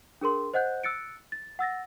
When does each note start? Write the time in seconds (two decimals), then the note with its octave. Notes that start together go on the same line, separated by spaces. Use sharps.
0.21 D4 G#4 A#4 C6
0.54 C5 D#5 F#5 F#6 G6
0.83 E6 F#6 A6 C#7 D7
1.32 A6
1.59 F#5 E6 A6 A#6